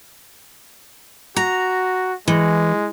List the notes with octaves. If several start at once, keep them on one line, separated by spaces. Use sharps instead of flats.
F#4 A#5
E3 G#3